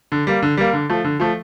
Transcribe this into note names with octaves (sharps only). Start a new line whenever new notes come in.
D3
G3 A#3
D3
G3 A#3
D3
F3 A3
D3
F3 A3